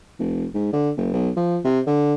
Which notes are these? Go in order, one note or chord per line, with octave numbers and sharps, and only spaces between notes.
F1
G#2
D3
F#1
B1
F3
C3
D3